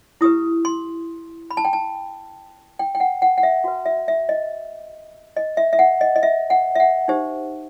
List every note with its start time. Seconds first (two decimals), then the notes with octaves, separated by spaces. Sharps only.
0.21 E4 G4 B4 D#6
0.65 C6
1.51 B5
1.57 A5
1.65 G5
1.73 A5
2.79 G5
2.95 G5
3.00 F#5
3.22 F#5
3.38 F#5
3.43 E5
3.64 F#4 B4
3.86 E5
4.08 E5
4.29 D#5
5.37 D#5
5.57 E5
5.73 E5
5.79 F#5
6.01 D#5
6.16 D#5
6.23 E5
6.50 F#5
6.75 E5
6.80 F#5
7.08 D#4 G4 C5